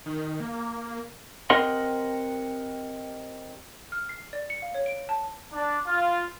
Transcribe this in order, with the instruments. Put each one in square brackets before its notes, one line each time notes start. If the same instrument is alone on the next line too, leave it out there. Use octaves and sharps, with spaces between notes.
[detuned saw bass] D#3
A#3
[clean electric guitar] C4 G4 A#4 D#5 F#5 C6
[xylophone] F6
C7
D5
C#7
F5
C#5
D7
A5
[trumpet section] D4
F4